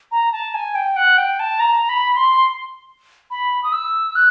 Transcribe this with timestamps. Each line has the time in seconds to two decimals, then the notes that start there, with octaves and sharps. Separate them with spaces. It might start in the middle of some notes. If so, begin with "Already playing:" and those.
0.12 A#5
0.32 A5
0.54 G#5
0.75 G5
0.96 F#5
1.18 G5
1.39 A5
1.60 A#5
1.89 B5
2.16 C6
3.31 B5
3.64 D#6
3.73 E6
4.15 F#6